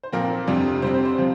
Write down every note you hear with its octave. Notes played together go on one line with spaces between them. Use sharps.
C5
A#2 F3 C4 A#4
F2 C3 G3 D4
C3 G3 C4 C5
C5
C5
C3 F3